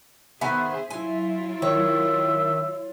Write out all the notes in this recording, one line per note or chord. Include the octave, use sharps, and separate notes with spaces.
D#3 B3 G#4 C5 E5 G#5
F#3 E4 F4 G#5
D#3 C#5 E5